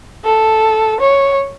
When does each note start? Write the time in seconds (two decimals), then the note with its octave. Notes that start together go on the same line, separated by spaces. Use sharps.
0.25 A4
1.00 C#5